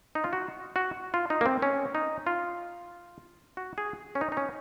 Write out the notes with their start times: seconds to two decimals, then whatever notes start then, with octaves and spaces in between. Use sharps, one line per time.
0.15 D#4
0.24 F4
0.33 F#4
0.76 F#4
1.14 F4
1.30 D#4
1.41 A#3
1.46 C4
1.62 C#4
1.95 D#4
2.27 F4
3.57 F#4
3.78 G#4
4.15 C#4
4.21 D#4
4.32 D#4
4.37 C#4